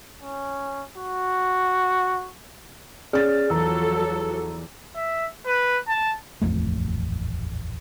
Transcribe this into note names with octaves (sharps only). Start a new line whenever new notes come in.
C#4
F#4
C#4 G#4 D5 F6 A6
E2 F3 F#3 A4 A#5 E6
E5
B4
A5
D#1 A1 F2 A3